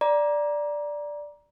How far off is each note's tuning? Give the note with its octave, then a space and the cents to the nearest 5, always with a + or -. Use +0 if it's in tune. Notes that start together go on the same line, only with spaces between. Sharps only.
D5 +0 A#5 +20